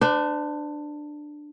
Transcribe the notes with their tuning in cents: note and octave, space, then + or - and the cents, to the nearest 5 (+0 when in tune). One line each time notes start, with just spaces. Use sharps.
D4 +15 C5 -40